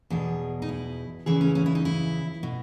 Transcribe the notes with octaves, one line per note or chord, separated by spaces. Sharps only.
E2 B2 G#4
D#4
E4
E2 C#3 E3 G#4
C#4
C#4
E4
D#4
E4
B2